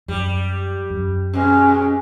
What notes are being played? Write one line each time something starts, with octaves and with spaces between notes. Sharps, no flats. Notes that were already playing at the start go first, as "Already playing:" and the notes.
F#2 G3
F#2
B2 G#3 C#4